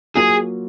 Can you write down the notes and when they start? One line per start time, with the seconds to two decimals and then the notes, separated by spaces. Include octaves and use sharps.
0.15 F#3 A#3 F4 G#4